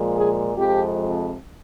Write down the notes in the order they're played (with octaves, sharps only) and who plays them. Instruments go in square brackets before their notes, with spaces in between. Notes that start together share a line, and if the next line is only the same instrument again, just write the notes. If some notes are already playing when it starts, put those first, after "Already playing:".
Already playing: [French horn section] A#2 F3 G#3
G#4
F2 C3 F3 G#3 G4